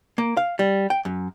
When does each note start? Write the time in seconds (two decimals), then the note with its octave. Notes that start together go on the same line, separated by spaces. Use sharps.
0.18 A#3
0.37 F5
0.59 G3
0.90 G5
1.05 F#2